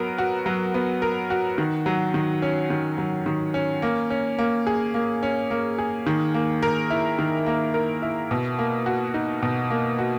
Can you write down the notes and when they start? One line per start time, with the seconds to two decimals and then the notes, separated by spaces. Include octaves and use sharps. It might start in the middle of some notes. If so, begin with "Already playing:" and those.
Already playing: F#3 B3 A#4
0.18 F#4
0.46 F#3
0.74 B3
1.02 A#4
1.30 F#4
1.58 D#3
1.86 F#3
2.14 D#3
2.42 C#4
2.70 D#3
2.98 F#3
3.26 D#3
3.54 C#4
3.82 A#3
4.10 C#4
4.39 A#3
4.67 G#4
4.94 A#3
5.23 C#4
5.51 A#3
5.78 G#4
6.07 D#3
6.34 A#3
6.63 A#4
6.90 E4
7.19 D#3
7.46 A#3
7.74 A#4
8.02 E4
8.31 B2
8.58 A#3
8.86 F#4
9.14 D#4
9.43 B2
9.70 A#3
9.99 F#4